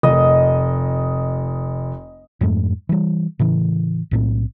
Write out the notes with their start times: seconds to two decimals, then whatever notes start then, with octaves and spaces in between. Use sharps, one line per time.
0.03 F1 D#5
2.41 F2 G#2 G#3 A3
2.89 E3 G3
3.39 A2 C#3 E3
4.11 B1 A2 C4